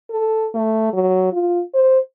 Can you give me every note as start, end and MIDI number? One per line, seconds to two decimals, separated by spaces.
0.10 0.46 69
0.54 0.92 57
0.93 1.30 54
1.33 1.62 65
1.74 1.99 72